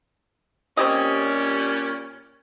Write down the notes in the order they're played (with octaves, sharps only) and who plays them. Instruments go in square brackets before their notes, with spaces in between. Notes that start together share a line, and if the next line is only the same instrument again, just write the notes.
[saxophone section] A#2 G3 C#4 [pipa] C4 G4 D#5